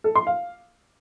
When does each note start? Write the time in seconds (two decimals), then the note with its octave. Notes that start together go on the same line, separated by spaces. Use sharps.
0.04 A4
0.15 C6
0.27 F5